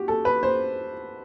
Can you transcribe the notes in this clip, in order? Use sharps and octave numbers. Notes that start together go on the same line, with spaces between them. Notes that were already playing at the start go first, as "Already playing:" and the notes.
Already playing: F#4 G4
A4
B4
C5